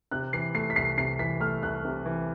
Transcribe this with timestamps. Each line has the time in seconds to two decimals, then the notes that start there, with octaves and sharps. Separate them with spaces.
0.11 C3 F#6
0.33 E3 C7
0.55 A3 C7
0.70 B6
0.76 C2 C7
0.97 C3 C7
1.19 E3 B6
1.40 A3 F6
1.62 C2 F#6
1.85 C3
2.06 E3